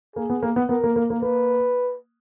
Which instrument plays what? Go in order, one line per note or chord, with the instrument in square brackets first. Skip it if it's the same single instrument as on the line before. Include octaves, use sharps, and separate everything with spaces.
[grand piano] A#3 [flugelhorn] G#4
[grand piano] B3
A#3
B3
[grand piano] B3 [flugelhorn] A#4
[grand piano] A#3
A#3
A#3
[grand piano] A#3 [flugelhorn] B4